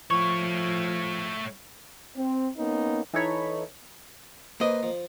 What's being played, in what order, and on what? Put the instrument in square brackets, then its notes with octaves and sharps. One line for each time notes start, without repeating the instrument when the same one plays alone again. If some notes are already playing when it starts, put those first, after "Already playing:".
[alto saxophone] F3 [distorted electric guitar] A3 C#5 [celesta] C#6
[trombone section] C4
A#3 B3 C#4 D#4
[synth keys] E3 D#4 A4 C#5 B5
[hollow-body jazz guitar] A#3 D#5 [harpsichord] B4 C5
[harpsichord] F3